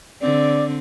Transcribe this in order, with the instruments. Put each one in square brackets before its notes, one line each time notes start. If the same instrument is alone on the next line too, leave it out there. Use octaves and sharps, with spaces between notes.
[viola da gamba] D3 C4 [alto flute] D5